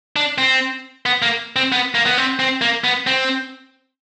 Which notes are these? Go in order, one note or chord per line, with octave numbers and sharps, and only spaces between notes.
D4
C4
B3
A#3
C4
B3
A#3
B3
C4
C4
A#3
B3
C4